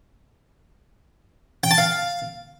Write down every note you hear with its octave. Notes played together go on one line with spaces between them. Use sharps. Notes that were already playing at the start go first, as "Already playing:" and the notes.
G5
A5
F5